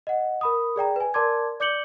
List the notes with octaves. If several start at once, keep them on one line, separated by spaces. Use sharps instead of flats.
D#5 F#5
A#4 B5 D#6
G#4 D5 G5 A#5
B4 G#5
A#4 D5 A5 C6 D6 G#6
D5 D6 G6 C#7 F#7 G7